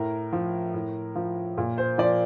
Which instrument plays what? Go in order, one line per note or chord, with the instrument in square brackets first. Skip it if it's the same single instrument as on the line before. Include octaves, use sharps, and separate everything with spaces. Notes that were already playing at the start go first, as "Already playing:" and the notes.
Already playing: [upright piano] A2 A#4
F3
A2
F3
A#2
C5
F3 D5